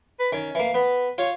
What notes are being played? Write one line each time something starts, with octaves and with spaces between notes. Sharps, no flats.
B4
D#3 C#4
E3 A#3
B3 B4
F4 C#5